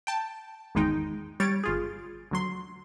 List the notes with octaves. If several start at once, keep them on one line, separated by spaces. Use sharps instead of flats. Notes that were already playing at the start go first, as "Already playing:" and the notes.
G5 A5
G#1 E2 D#3 G#3 D#4 G5
G3 C#5 A6 D7
G1 F4 G#4
D2 F#3 C6